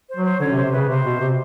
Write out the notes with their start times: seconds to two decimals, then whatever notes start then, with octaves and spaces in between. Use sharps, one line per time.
0.08 C5
0.17 F#3
0.24 C5
0.40 D3 C#4 C#5
0.52 C3
0.57 C5
0.64 C3
0.72 C#3 B4
0.88 C3 C5
1.05 B2
1.20 C3